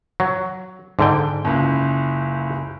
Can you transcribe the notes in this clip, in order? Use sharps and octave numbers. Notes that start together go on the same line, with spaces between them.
F#3
G#2 D3 G5
F#1 C#2